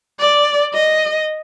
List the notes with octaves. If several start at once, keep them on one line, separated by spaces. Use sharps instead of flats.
D5
D#5